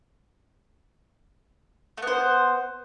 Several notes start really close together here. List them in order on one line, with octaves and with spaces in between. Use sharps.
A3 B3 C5